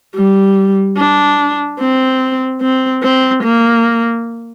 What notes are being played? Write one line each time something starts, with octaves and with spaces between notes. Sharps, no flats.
G3
D4
C4
C4
C4
A#3